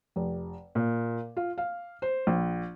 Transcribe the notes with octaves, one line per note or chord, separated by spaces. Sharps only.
F1
A#2
F4
F5
C5
A#1